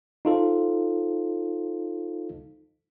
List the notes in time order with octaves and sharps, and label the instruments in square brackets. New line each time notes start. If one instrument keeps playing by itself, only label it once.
[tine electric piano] D#4 F4 A4 C5